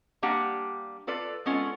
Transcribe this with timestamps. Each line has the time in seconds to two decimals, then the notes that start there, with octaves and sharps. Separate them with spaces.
0.23 G3 A#3 D4 G4 F#5
1.07 F4 A4 B4 D5
1.46 G#3 B3 C#4 F4 A4